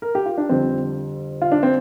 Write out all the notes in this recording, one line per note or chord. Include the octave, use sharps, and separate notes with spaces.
A#4
G4
F4
D4
F2 D3 G3 C4
F4
D4
C4